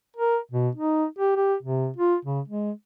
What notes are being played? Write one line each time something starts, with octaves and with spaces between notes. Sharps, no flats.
A#4
B2
D#4
G4
G4
C3
F4
C#3
G#3